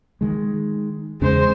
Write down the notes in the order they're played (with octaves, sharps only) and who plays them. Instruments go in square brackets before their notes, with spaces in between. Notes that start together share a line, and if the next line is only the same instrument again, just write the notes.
[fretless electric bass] D#3 G#3
[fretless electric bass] E2 C#3 C#4 [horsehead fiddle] G#3 C5